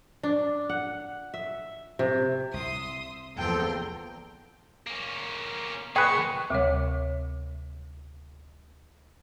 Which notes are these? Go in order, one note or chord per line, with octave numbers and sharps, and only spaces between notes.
D4
F#5
E5
C3
C2 E5 C6 D#6
E2 F3 A#3 C4 A4 G5 A#5 C6
A#3 C#4
A#2 G#4 B4 G5 C#6
D2 C3 G3 C#5